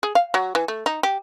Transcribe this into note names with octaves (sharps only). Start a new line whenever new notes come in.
G#4
F5
F#3
E3
A3
D#4
G4